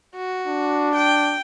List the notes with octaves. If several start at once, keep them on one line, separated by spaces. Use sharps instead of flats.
F#4
D4
G5